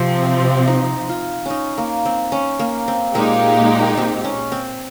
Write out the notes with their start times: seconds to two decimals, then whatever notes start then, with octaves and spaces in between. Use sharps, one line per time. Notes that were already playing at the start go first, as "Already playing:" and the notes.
Already playing: C3 F3 C4
0.68 D#4
1.09 F4
1.46 C#4 D#4
1.78 A#3
2.05 C4
2.32 C#4
2.59 A#3
2.88 C4
3.14 A#2 G#3 A#3 D#4 G4
3.97 C4
4.24 C#4
4.52 C4